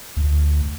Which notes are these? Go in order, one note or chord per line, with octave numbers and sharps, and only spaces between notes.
D2